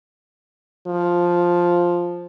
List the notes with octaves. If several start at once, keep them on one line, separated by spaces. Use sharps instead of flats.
F3